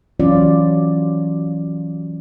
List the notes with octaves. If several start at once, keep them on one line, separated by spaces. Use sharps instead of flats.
E3 F#3 C#4 F4 D5